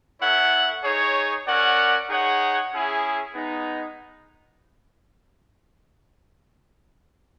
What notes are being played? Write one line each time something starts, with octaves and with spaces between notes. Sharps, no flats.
B3 E4 A4 C#5 F#5
D#4 G#4 C#5
C#4 F#4 A#4 D5 F#5
D#4 G#4 C#5 F#5
C#4 E4 G#4
G#3 B3 D#4